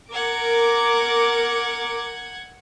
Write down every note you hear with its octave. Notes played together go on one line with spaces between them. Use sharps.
A#4 F#5 D6 G#6